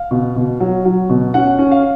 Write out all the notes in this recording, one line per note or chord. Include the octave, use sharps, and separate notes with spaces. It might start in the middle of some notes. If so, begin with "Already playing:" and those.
Already playing: F5
B2
B2
F#3
F#3
B2
C#4 F#5
C#4
F5